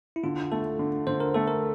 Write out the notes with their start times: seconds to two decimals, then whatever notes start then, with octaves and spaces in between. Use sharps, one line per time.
0.16 E4
0.23 D3 F4
0.52 A3 A4
0.79 D3
1.07 D3 C5
1.20 A#4
1.34 A3 A4
1.48 A#4